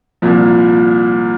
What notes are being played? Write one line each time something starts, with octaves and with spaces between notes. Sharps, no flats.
C2 A#2 F3